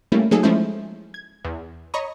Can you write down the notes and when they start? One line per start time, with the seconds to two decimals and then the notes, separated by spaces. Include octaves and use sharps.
0.12 G3 A3 A#3 C#4 E4
0.31 F#3 A3 A#3 D#4 G#4 A4
0.43 F3 G#3 A3 C#4 E4 C5
1.14 G#6
1.45 E2
1.94 C#5 D#5 A#5 B5 C#6 D#6